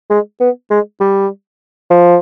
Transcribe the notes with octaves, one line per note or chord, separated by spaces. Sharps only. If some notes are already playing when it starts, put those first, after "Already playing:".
G#3
B3
G#3
G3
F3